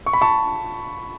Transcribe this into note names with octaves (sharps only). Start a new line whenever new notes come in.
C#6
B5
A5 C#6